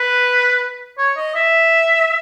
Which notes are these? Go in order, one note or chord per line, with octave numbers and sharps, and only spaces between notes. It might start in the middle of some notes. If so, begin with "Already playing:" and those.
Already playing: B4
C#5
D#5
E5